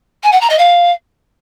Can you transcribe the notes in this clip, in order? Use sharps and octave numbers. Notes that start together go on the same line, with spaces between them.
G#5
F#5
A#5
D#5
F5